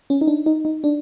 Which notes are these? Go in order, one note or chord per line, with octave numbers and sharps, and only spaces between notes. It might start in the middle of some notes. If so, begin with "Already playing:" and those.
C#4
D#4
D4
D#4
D#4
D4